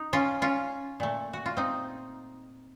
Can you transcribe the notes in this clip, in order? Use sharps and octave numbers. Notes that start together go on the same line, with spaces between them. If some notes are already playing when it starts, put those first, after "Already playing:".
Already playing: D#4
C#4 F4
C#4 F4
A#2 A3
F#4
F4
C4 D#4